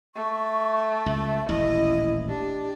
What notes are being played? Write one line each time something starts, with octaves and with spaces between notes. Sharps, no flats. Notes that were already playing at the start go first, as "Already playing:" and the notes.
A3 C#6
C#2 E5
D#1 A1 E4 D#5
D4 G4